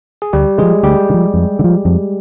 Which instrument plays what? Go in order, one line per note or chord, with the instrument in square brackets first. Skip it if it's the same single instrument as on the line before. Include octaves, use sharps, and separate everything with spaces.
[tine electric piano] G#4
[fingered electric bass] D2 [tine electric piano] G3 G4
[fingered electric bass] D3 F3 [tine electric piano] G#3 G#4
[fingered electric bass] D2 [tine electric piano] G3 G4
[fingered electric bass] D3
F3
F2
D3
F3
F2